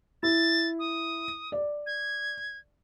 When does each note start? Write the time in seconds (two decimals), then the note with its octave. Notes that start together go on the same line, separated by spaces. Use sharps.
0.23 E4 A6
0.79 D#6
1.52 D5
1.86 G#6